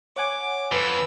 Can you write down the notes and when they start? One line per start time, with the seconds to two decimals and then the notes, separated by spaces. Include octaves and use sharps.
0.16 C#5 F#5 G#5 D6
0.72 F2 B4 E6